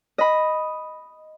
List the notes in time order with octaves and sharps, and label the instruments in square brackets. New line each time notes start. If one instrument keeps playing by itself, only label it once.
[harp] D#5 B5